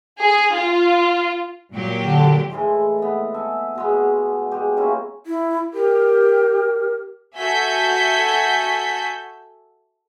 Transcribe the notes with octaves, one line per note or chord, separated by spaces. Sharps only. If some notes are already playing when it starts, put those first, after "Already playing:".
G#4
F4
A#2 F#3 G4
D3
A2 E3 G#3 C6
B3 E4
A4 E5 G#5
B2 G#3 B3
G#3 G4
A#3 C#4 E4 F4
E4
G4 A#4
F#4 A4 E5 G#5 G6 B6